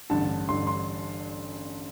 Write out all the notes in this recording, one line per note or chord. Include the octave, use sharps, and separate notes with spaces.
A1 G2 D3 A5
A1 G2 D3 C6
C6